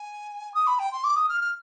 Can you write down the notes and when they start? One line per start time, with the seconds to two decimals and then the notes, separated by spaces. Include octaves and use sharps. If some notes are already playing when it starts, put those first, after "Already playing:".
Already playing: G#5
0.54 D#6
0.67 B5
0.79 G5
0.92 C6
1.04 D6
1.16 D#6
1.29 F6
1.41 F6